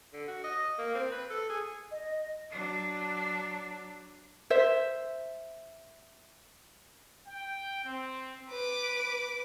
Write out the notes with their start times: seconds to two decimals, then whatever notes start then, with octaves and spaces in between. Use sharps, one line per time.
0.13 D3
0.28 F#4
0.44 D#5
0.78 A#3
0.95 C4
1.12 B4
1.30 A4
1.49 G#4
1.91 D#5
2.50 F#3 D4
4.50 C5 E5
7.27 G5
7.84 C4
8.49 B4 D6